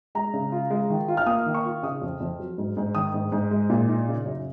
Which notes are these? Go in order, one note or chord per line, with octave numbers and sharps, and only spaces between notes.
G#3 A#5
C#3
F4
G#3
D#3
F4
F6
A#3 D#6
D#3
C#6
F4
C#3 D#6
F2
F2
F#3
G#2
G#2
D#3 D#6
G#2
G#2
G#3
A#2
D#4
C#3
F#2